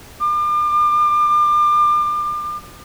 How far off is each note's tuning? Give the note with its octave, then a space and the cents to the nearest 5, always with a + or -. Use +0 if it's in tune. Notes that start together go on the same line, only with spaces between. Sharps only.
D6 +35